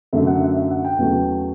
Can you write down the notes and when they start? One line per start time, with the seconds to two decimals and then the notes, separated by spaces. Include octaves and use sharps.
0.13 F#2 D3 F#3 A3 E5
0.27 F#5
0.40 E5
0.56 E5
0.71 F#5
0.84 G5
0.98 E2 C#3 F#3 A3